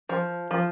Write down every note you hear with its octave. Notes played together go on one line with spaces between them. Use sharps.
F3
F3